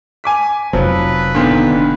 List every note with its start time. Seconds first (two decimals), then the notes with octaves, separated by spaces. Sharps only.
0.24 G#5 D6 B6
0.73 F1 F3 F#3 B4
1.35 A#2 D3 D#3 B3 C6